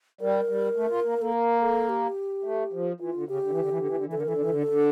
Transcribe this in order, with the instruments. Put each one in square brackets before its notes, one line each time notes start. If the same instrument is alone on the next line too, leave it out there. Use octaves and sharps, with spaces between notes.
[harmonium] G3 [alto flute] A#4
[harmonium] G3
A3
F4
A#3
[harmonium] A#3 [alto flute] A4
[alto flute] A#4
A4
G4
[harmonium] A3
F3
[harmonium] E3 [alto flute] F4
[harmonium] D3
[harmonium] C#3 [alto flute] G4
[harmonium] D3
E3
D3
E3
D3
E3
D3
E3
[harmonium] D3 [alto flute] A4
[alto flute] A#4
[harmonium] E3
[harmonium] D3 [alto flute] A4
[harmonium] E3
D3
D3